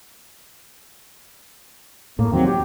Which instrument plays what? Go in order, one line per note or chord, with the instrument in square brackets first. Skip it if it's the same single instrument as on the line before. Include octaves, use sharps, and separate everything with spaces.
[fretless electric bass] A2 [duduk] A#3
[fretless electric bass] E2 D#3 F#3 [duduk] C4
[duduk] G4